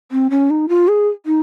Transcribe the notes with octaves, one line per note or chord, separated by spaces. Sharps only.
C4
C#4
D#4
F4
G#4
D#4